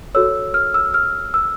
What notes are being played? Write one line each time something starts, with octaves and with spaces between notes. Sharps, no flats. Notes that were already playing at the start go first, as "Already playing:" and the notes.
F#4 A4 C#5 E6
F6
E6
F6
E6